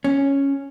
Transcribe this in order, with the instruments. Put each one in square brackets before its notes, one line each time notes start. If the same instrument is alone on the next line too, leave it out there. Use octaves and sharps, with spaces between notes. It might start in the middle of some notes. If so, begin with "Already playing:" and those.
[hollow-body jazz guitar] C#4